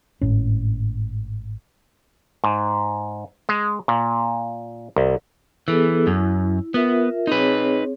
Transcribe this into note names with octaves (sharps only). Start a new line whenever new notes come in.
G#1 A2 C#4
G#2
G#3
A#2
C2
E3 B3 G#4 A4
F#2 E4
B3 F4 A#4 E5
C4 D#4 G#4 B4 C#5